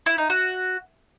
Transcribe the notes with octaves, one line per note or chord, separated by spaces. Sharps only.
E4
D#4
F#4